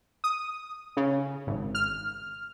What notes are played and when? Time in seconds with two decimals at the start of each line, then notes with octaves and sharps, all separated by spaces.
0.24 D#6
0.97 C#3
1.47 G#1
1.75 F6